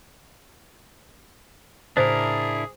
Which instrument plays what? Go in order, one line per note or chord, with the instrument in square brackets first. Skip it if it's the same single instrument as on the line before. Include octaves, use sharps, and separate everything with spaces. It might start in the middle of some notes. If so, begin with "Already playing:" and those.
[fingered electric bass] A2 C#3 [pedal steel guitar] D4 E4 A#4 [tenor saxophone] G#4 [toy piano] C5